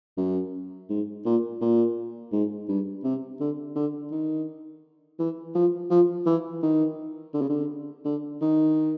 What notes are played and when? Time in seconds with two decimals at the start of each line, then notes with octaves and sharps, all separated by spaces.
0.17 F#2
0.90 G#2
1.26 A#2
1.61 A#2
2.32 G#2
2.69 G2
3.04 C3
3.40 D3
3.76 D3
4.11 D#3
5.19 E3
5.55 F3
5.90 F3
6.26 E3
6.63 D#3
7.34 D3
7.41 C#3
7.49 D3
8.05 D3
8.41 D#3